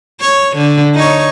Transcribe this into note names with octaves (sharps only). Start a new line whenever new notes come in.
C#5
D3
D#4 C#5